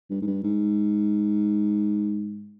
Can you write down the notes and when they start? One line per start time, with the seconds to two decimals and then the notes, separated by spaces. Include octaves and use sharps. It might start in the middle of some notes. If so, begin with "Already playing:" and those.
0.10 G2
0.22 G#2
0.27 G2
0.44 G#2